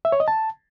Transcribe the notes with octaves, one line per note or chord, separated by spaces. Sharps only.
E5
C#5
D#5
A5